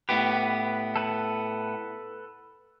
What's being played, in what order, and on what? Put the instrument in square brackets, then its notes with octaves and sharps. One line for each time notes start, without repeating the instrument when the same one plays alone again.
[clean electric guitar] A2 B3 G4 [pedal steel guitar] B4
[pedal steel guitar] A4 B4 F#5